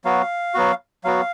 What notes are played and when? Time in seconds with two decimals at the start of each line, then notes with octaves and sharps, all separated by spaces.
0.05 F#3 B3 F#4 F5
0.54 F#3 B3 F#4
1.04 F#3 B3 F#4 F5